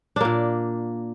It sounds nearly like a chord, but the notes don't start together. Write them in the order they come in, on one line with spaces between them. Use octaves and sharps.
D4 A#3 A#2